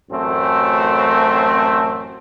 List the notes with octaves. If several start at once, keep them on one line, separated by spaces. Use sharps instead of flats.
A1 F#2 A3 C4